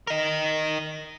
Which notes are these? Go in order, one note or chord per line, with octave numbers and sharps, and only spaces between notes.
A#4 D#5